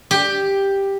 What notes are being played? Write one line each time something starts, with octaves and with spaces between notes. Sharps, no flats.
G4